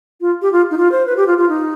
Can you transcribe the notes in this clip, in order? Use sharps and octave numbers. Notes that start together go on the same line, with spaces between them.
F4
G4
F4
D#4
F4
C5
B4
G4
F4
F4
D#4